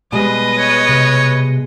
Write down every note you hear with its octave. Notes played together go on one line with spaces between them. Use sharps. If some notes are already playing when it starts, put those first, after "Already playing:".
B2 G3 G#3 B4 D#5
C#5
C3